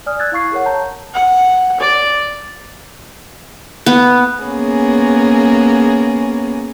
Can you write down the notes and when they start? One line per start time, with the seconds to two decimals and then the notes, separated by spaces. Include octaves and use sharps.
0.06 D5 G#5 D#6 F6
0.19 E6 F#6 G#6 A6
0.32 E4 F5 C#6 C7
0.52 G#4 A#4 C#5 F#5
0.65 C#5 A5 A#5 G6
1.14 F#5
1.80 D5
3.86 B3
4.44 A#3 B3 C#4 G#4